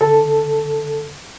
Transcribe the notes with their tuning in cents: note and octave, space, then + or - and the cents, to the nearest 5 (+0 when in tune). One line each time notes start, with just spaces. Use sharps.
D3 +0 A4 +0